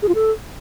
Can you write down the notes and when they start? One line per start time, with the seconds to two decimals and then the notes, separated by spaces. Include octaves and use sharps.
0.02 G#4
0.09 F4
0.15 A4